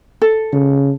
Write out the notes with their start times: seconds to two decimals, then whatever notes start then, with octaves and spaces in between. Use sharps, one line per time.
0.22 A4
0.53 C#3